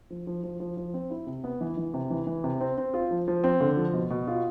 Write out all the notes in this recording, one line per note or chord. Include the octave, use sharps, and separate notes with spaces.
F3
F3
F3
F3
F3
C4
E4
C3
B3
E3
E3
C3
E3
E3
C3
C4
C4
F4
F3
F3
C4
D3
F3
B2
B2
F4